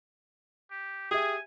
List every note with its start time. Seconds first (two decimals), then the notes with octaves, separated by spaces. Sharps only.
0.71 G4
1.11 G4 G#4 E5 G#5